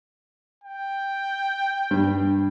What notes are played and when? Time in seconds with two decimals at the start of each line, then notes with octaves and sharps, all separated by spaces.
0.64 G5
1.91 G2